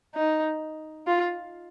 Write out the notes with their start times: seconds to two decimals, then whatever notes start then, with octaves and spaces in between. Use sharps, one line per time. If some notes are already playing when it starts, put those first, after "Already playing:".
0.15 D#4
1.07 F4